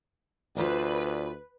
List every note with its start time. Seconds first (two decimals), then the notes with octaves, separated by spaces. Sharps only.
0.56 D2 F4 B4 C5 D5